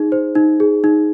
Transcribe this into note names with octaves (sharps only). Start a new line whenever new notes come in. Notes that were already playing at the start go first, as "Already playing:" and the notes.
Already playing: D#4 G#4
C5
D#4
G#4
D#4